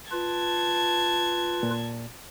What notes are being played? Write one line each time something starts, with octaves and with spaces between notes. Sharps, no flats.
F4 B4 A5 G#6
A#2